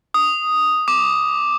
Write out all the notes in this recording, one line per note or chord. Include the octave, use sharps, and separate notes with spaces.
D#6
D6